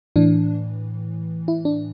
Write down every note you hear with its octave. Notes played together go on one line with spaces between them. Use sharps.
A2 E3 D4
E4
D4